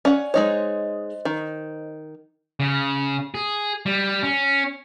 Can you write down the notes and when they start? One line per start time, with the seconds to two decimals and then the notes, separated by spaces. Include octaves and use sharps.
0.05 C#4 D5 F#5
0.34 G#3 D#4 C5 C#5 D#5
1.25 D#3
2.60 C#3
3.35 G#4
3.86 G3
4.23 C#4